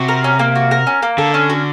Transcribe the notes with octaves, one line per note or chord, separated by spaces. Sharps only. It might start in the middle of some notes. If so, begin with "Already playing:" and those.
Already playing: C3 F#4
A#4
C#4
A#3
F#4
A#4
C#4
A#3
D3 A4
C#4
F#4